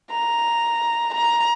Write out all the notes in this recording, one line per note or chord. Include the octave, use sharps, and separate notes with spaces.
A#5
A#5